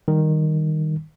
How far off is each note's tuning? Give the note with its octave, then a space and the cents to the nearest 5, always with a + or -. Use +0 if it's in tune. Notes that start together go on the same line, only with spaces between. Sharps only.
D#3 +0 G3 +0